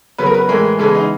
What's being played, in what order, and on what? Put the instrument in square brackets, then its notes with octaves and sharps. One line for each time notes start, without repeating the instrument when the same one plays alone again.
[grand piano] C#3 F#3 B3 B4
A#4
B4
A2 E3 G#3 A#4
C#3 E3 G#3 B3 A4
D#4